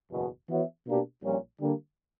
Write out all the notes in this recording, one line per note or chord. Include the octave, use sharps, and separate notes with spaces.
F#1 E2 B2
E3 B3 F#4 C#5 E5
B2 A#3 D4 G4
A#1 A#2 G3 C#4
D3 G3 A#3 D4